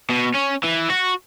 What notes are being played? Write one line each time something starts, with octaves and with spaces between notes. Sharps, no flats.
B2
C#4
E3
F#4